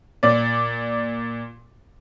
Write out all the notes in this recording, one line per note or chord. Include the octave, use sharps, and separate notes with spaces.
A#2 D5